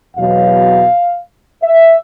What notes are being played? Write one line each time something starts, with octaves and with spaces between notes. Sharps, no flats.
E2 B2 F#3 F5
E5